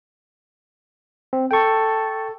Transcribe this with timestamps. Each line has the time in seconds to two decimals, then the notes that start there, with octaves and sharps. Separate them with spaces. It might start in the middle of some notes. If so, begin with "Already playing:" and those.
1.33 C4
1.51 A4 G5 C#6